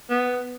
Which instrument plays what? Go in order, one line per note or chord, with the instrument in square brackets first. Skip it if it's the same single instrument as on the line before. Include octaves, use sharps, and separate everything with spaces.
[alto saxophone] B3